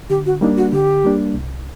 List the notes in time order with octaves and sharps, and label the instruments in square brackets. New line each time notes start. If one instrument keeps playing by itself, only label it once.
[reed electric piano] D3 [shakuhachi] G4
[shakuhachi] F#4
[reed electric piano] G3 A#3 D4 [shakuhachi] D#4
[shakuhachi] F#4
[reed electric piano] D3 [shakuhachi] G4
[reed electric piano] G3 A#3 D4
C2